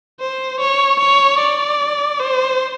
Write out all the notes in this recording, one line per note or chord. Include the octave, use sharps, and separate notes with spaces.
C5
C#5
C#5
D5
C5